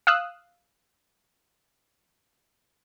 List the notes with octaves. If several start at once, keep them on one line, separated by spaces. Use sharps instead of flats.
F5 D#6 E6 F#6